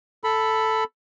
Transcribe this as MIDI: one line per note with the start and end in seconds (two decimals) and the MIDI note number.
0.24 0.84 69
0.24 0.84 83